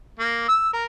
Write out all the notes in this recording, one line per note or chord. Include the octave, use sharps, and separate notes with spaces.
A#3
E6
A#4